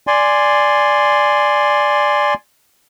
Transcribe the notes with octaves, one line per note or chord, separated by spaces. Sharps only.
D5 G#5 C6